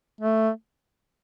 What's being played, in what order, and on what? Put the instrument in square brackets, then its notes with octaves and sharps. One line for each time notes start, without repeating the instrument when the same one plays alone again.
[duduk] A3